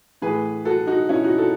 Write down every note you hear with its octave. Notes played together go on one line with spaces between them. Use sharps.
A2 E3 G#4 B4
F#4 A4
D#4 F#4
C#4 E4
D#4 F#4
F#4 A4